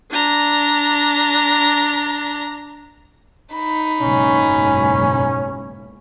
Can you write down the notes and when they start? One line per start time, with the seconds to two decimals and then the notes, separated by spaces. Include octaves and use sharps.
0.11 D4 A#5
3.54 D#4 B5
4.01 F#1 B1 G#2 C#4